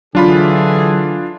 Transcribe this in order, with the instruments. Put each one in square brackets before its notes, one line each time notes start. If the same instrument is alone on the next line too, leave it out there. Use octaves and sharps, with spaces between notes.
[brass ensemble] D3 E3 G#4 [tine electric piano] F#3 [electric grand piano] D4 F4 B5